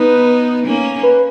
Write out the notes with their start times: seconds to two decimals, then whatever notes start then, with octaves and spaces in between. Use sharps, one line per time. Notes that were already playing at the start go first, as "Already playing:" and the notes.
Already playing: B3 D#4 B4
0.66 A#3 C#4
1.03 B4